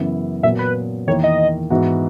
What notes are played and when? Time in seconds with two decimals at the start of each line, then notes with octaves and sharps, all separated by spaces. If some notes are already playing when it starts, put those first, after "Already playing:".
Already playing: F#2 C#3 E3 B3 E4
0.43 A#2 F#3 B3 E5
0.59 B4
1.07 E2 D#3 A#3 E4 C#5
1.24 D#5
1.70 G#2 E3 B3 F#4